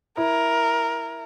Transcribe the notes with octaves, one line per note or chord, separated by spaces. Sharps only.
E4 A#4